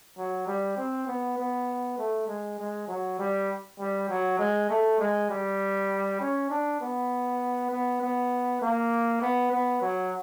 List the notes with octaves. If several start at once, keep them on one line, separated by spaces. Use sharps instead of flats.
F#3
G3
C4
B3
B3
A3
G#3
G#3
F#3
G3
G3
F#3
G#3
A3
G#3
G3
C#4
D4
B3
B3
B3
A#3
B3
B3
F#3